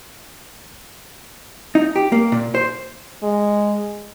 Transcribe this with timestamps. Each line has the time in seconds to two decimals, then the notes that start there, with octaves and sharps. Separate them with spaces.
1.75 D#4
1.96 G4
2.12 A#3
2.32 A#2
2.55 C5
3.23 G#3